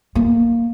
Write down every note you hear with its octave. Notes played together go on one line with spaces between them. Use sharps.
A#3